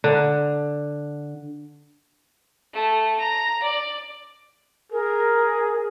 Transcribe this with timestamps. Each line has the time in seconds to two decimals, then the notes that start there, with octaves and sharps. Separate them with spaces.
0.04 D3
2.74 A3
3.19 A#5
3.62 D5
4.92 G#4 A#4